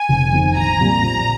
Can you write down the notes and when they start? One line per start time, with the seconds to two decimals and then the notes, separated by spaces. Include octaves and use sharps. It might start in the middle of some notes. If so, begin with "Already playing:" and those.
Already playing: G#5
0.09 F1
0.33 F2 D#3
0.56 A#1 A#5
0.80 A#2 G3 C4
1.03 A#1